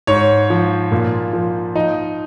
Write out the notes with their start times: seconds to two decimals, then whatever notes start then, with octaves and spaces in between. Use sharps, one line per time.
0.07 G#2 C#5
0.50 F3
0.92 A#2
1.33 F3
1.75 F3 D#4